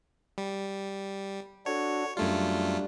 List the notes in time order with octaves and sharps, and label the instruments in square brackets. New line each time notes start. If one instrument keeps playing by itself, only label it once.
[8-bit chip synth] G3
[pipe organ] D4 F#4 A4 [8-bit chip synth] C#5
[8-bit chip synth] F#2 A3 F4 [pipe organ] G3 D4